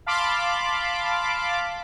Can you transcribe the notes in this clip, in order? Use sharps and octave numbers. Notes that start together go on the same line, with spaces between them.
F5 A5 B5 C6 D6